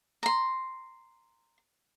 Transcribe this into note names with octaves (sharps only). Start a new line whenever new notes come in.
A#5 C6